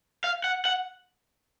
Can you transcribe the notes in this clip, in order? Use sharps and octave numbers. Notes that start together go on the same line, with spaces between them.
F5
F#5
F#5